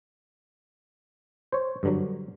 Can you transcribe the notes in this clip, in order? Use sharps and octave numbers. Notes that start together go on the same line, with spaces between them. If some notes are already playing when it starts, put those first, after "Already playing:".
C5 C#5
G2 D3 F#3